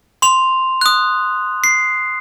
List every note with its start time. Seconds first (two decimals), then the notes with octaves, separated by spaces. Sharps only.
0.22 C6 F7
0.81 D#6 F#6
1.64 C7